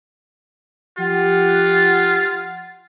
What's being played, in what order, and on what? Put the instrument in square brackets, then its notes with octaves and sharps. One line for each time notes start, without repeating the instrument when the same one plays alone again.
[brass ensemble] F3 G4 F#5 [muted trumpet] F4